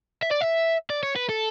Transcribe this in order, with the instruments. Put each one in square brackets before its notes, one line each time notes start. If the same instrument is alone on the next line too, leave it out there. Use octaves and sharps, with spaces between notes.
[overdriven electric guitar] E5
D5
E5
D5
C#5
B4
A4